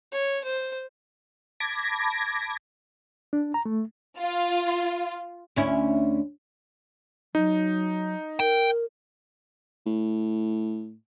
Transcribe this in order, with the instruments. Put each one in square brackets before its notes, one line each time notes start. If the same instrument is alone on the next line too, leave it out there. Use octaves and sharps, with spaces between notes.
[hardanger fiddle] C#5
C5
[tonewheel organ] A5 B5 D6 G#6 A#6
[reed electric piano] D4
A#5
A3
[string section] F4
[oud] D2 C#4 E4
[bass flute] F#3 [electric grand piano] D#4
[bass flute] A#4 [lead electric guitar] G5
[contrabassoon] A2